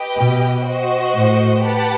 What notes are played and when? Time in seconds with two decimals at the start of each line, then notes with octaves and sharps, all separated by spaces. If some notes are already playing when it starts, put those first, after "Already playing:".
Already playing: G4 B4 D#5 G5
0.17 B2
0.66 F#4 C5 D#5
1.15 A2
1.64 G4 B4 F#5 A5